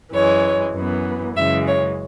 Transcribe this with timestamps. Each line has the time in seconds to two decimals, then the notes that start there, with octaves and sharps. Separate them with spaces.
0.13 F#2 E3 G#3 C#5
0.74 F#2 E3 B3
1.36 F#2 C#3 E3 G#3 E5
1.68 C#5